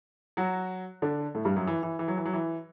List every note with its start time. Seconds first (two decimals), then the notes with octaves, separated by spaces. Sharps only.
0.37 F#3 F#4
1.02 D3 D4
1.35 A2 A3
1.45 G2 G3
1.56 F#2 F#3
1.67 E3
1.83 E3
1.99 E3
2.08 F#3
2.17 E3
2.25 F#3
2.33 E3